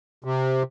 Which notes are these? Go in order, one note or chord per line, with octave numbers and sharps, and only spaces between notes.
C3